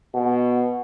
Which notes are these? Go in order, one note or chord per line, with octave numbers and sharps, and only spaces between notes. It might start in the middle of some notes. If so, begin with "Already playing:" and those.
B2